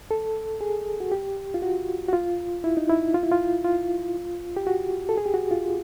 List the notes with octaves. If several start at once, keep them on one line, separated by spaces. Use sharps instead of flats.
A4
G#4
F#4
G4
F4
F#4
F#4
F4
E4
D#4
E4
F4
E4
F4
F4
G4
F#4
A4
G#4
G4
F#4
F4